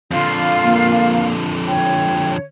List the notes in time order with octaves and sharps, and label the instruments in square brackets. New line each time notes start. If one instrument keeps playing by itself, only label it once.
[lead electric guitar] F2 D3 [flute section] F4 F5
[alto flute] A#3
[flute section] C#5 [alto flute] G5